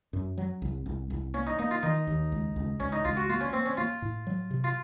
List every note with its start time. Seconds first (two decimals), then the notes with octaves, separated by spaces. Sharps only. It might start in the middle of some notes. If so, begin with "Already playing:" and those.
0.13 F#2
0.38 F#3
0.62 C2
0.86 C2
1.10 C2
1.34 A#3 C#4
1.47 D#4
1.59 A#3 D#4
1.71 F4
1.83 D#3 D#4
2.07 D#2
2.32 C#2
2.56 C#2
2.80 C#2 C#4
2.92 D#4
3.05 C#2 F4
3.17 F#4
3.29 A#3 F4
3.41 C#4
3.53 A#3 C4
3.66 C#4
3.77 A#3 F4
4.02 A2
4.27 F#3
4.51 C3
4.64 F4